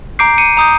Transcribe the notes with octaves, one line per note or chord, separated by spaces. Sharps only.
A#5 D6 G6 C7 D7
C#7 D#7
A#5 D#6 G6